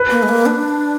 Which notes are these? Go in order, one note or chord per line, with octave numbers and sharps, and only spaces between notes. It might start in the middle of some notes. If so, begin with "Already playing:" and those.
Already playing: B4
A#3
G#3
A#3
D4